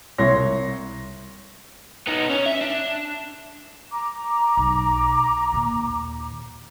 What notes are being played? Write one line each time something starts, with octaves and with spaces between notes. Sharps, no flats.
C2 C#5 C6 A#6
B3 D#4
C#4
E5
D4
A#5 D6
B1
D#2 A#2